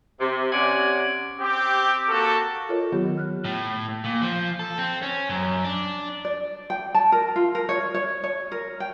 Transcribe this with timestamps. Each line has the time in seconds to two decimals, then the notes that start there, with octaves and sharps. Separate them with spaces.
0.19 C3
0.53 C3 C#4 D5 F#5 G#5
1.39 C4 G4
2.08 A#3 F#4 A4
2.69 F4 A4 A#4 C#5 D#5
2.92 D#3 F#3 B3 F4 G4 C#5
3.17 F6 F#6
3.44 A2
4.04 A#2
4.22 F3
4.59 A4
4.78 C4
5.03 C#4
5.29 F#2
5.64 D4
6.25 D5
6.70 G5
6.95 A5
7.12 A#4
7.36 F4
7.55 A#4
7.69 C#5
7.94 C#5
8.24 C#5
8.52 A#4
8.80 G5